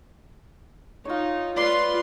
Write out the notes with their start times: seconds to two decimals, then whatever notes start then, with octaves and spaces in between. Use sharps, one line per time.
1.05 D#4 F4 C#5
1.57 F4 B4 D5 C6